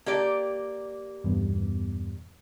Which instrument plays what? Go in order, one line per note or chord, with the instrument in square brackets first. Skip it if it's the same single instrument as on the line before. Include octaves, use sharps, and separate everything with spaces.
[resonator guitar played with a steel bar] A#3 G4 D5
[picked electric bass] E2 G2 B2